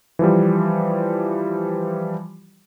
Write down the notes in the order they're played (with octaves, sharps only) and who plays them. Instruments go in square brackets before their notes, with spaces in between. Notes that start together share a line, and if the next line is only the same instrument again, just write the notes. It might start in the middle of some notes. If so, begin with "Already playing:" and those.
[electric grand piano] E3 F3 G3